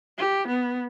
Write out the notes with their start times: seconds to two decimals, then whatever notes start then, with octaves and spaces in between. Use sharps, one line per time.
0.18 G4
0.48 B3